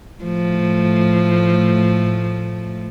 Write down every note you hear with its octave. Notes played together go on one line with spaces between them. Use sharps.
A2 F3 A3